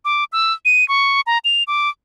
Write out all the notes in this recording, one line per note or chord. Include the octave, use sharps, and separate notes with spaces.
D6
E6
D#7
C#6
A#5
F7
D6